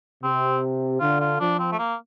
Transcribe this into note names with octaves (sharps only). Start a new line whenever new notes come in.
C3 C4
D3 F4
F4
F3 D4
C4
A3
A#3